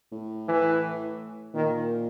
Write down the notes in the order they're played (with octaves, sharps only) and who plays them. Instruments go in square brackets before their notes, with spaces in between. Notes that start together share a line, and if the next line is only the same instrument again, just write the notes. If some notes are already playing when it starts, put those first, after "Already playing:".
[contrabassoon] A2
[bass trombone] E3
[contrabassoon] A#2 [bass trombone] D#3